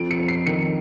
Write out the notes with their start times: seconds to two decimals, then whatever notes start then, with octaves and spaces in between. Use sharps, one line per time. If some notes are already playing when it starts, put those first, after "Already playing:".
Already playing: F2 D7
0.11 C#7
0.19 F2
0.28 C7
0.47 D#3 C#7